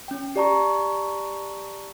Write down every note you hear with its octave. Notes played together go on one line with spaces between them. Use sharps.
C#4 G5
G4 D5 A5 A#5 C#6